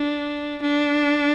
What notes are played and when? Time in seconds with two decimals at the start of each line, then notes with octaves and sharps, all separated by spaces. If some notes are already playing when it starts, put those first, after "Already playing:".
Already playing: D4
0.62 D4